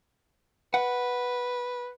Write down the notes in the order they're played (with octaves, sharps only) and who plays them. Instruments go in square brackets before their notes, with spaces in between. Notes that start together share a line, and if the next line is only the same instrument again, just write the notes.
[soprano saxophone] B4 [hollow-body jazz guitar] F#5